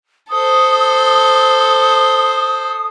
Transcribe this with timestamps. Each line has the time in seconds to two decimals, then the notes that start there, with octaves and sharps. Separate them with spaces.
0.31 A4 C5 D#6